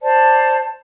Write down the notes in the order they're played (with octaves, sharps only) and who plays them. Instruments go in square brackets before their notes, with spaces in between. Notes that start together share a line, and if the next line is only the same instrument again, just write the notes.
[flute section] C5 D5 A5